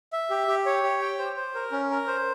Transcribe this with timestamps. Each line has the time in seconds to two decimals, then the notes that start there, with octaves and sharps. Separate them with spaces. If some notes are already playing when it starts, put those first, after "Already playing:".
0.13 E5
0.30 G4
0.47 G4
0.66 C#5
0.83 G4
1.01 G5
1.19 C5
1.36 C5
1.55 A#4
1.72 C#4
1.91 A#4
2.07 C5